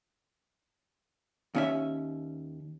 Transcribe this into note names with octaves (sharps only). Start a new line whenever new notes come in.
D#2 C#4 E5